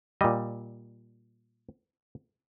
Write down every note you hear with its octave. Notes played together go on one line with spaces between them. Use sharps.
A#2 G3 D#5